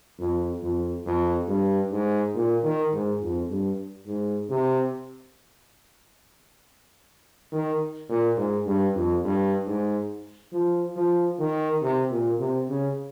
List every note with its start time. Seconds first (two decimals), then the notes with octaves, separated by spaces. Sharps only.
0.19 F2
0.62 F2
1.06 F2
1.48 G2
1.91 G#2
2.34 A#2
2.63 D#3
2.93 G#2
3.21 F2
3.50 G2
4.07 G#2
4.50 C3
7.52 D#3
8.09 A#2
8.37 G#2
8.67 G2
8.95 F2
9.24 G2
9.66 G#2
10.53 F3
10.96 F3
11.39 D#3
11.82 C3
12.11 A#2
12.39 C3
12.69 C#3